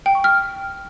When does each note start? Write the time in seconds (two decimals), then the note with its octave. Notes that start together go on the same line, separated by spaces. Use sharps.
0.06 G5
0.15 C#6
0.24 F6